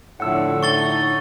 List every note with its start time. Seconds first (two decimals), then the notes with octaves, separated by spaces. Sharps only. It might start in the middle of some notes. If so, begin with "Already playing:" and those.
0.20 A2 D3 F3 F#5 E6
0.63 D#4 C#6 A6 G7